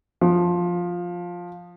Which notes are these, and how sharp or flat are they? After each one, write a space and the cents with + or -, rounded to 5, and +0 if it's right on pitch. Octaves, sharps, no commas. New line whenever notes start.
F3 +10